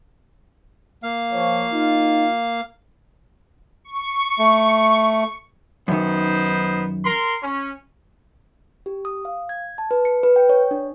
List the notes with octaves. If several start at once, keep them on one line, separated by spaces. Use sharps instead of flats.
A#3 F5
F3 C#5
D#4 F4
C#6
A3
F#2 D#3 B3 D#4 C5
A#4 C6
C#4
G4
D#6
F5
G#6
A5
B4
C#7
B4
G5
C#5
D4